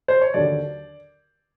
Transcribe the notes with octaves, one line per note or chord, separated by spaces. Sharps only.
C5
C#5
D#2 D3 F#3 D5